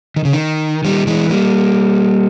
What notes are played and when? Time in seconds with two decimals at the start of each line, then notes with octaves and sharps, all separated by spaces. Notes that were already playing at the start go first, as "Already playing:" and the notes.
0.16 D#3
0.25 C#3
0.33 D#3
0.84 D#3 G3
1.07 E3 G#3
1.30 G3 A#3